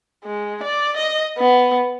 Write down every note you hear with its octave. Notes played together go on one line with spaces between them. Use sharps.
G#3
D5
D#5
B3